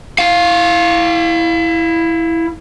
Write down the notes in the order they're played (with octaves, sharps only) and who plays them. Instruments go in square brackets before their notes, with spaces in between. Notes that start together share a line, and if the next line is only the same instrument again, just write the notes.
[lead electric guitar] E4 F5